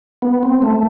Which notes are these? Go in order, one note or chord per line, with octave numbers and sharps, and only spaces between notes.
B3
C4
A3